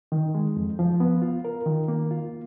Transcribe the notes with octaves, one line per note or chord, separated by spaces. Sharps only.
D#3
G#3
F2
F3
B3
F4
A#4
D#3
A#3
F4